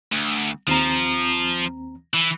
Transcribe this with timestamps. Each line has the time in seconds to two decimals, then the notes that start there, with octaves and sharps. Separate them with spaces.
0.12 D2
0.68 D#2 F3 C4 A#5
2.14 E3